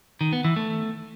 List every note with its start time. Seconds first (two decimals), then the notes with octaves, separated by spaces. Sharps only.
0.21 D#3
0.33 B3
0.45 E3
0.56 A3